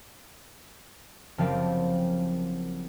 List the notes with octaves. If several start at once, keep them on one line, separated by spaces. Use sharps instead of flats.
F#1 F3 C4 G4 A#4 F5